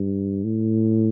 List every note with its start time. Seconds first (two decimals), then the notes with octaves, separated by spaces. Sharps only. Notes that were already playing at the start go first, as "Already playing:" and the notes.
Already playing: G2
0.44 A2